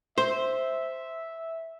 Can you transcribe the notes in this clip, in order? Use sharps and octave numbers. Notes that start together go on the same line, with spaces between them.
C5 E5